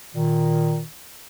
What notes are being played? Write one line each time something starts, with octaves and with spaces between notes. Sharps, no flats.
A#2 D#3